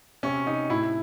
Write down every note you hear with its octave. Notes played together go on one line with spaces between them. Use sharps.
C3 C#4
C3 D#4
A2 E4